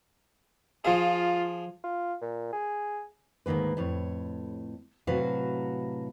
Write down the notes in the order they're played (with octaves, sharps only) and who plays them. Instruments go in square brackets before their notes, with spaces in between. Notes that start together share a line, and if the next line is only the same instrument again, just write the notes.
[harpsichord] F3 G#4 [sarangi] F4
[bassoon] F4
A#2
G#4
[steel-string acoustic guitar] D2 G#2 D#3 A#3 B4
F2 A2 C#5
A2 C3 F#3 F#4 B4 F5